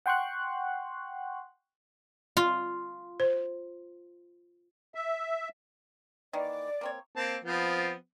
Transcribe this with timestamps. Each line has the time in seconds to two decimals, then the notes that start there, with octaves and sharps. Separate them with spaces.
0.06 F#5 G5 C6 C#6 F#6
2.37 F4
3.20 C5
4.95 E5
6.33 D#3 E3 A#3 D5
6.81 A#3 C4 C#5
7.16 A#3 C4 A5
7.44 F3 B3 C4